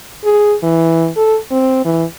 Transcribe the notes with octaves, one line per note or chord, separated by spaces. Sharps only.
G#4
E3
A4
C4
E3